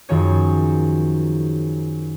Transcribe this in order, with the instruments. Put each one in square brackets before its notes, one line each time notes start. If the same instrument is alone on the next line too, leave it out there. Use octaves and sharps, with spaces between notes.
[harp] F#2 D#3 F3 G#4 C#5